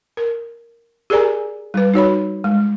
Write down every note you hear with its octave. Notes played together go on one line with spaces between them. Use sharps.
A#4
G4 G#4 A#4 D5 G#5 A#5
G3 B4
D#4 F#4 C#5 B5
G#3